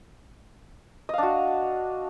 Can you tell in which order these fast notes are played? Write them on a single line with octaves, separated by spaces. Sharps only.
D#5 F5 D4 F#4